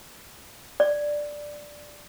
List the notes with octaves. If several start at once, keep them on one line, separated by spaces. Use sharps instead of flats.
D5